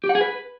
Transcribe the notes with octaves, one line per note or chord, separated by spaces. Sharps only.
G4
F#5
G#4
B4